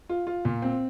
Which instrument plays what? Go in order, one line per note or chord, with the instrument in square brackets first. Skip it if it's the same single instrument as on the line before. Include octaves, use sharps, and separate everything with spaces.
[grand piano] F4
F4
A#2
C4